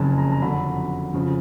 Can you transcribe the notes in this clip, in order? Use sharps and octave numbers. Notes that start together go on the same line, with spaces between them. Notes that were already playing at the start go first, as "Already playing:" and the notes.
Already playing: F#1 F2 C#3 G#5 A5
A#5
A#5
F2 D3 F#3 B5
F2 C#3 F3